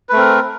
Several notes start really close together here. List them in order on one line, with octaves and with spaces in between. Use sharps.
B4 A3 C4 A#4